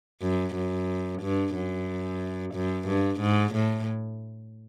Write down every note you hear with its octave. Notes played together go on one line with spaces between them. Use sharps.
F#2
F#2
G2
F#2
F#2
G2
G#2
A2